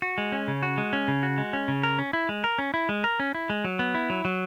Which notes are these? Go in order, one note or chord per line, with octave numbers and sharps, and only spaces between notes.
F#4
G#3
C#4
C#3
F#4
G#3
C#4
C#3
F#4
G#3
C#4
C#3
A#4
C#4
E4
G#3
A#4
C#4
E4
G#3
A#4
C#4
E4
G#3
F#3
B3
E4
F#3
F#3